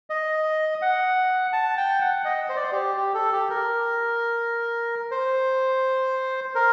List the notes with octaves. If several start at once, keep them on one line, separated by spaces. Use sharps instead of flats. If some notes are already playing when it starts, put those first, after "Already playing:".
D#5
F#5
A5
G5
F#5
D#5
C5
D5
C5
G4
G4
A4
G4
A#4
C5
A#4